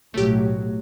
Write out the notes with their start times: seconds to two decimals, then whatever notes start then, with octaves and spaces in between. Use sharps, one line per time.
0.14 B1 A2 F#3 A3 G4